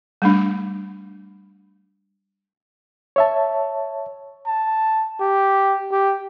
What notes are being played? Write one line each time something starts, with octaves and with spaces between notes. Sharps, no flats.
G3 A3 D4
C#5 E5 A5
A5
G4
G4